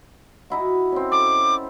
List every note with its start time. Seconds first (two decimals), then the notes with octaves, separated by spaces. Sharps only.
0.50 D#4 E4 F#4
0.92 C4 C#4
1.12 A4 D6